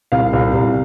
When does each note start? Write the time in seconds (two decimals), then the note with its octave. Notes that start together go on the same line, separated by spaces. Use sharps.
0.12 C2 F5
0.33 C2
0.54 C2